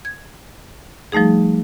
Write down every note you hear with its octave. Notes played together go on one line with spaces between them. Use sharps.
G#6
F3 G3 A3 D#4 G#4